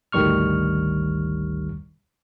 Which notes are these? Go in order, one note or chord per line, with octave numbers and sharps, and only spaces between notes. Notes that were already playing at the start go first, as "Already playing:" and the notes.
G#1 D2 D#3 G3 C#6 F6